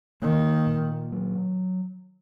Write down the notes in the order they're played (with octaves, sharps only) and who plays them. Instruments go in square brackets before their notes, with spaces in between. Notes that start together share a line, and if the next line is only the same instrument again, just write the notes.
[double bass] D#3 [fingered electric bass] A#3
[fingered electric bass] A#2
F#3